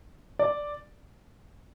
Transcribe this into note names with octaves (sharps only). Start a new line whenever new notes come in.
D5